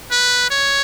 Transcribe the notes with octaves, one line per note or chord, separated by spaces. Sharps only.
B4
C#5